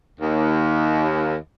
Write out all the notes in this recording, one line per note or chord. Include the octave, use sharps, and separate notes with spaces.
D#2